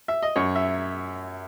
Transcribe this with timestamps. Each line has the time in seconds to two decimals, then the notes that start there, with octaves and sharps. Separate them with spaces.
0.08 E5
0.22 D#5
0.36 F#2 C#5
0.56 E5